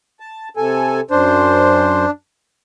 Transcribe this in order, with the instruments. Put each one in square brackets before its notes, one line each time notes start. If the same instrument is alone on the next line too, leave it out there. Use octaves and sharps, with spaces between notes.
[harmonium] A5
C3 A4 G#5
[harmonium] F#2 C5 [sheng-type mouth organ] D4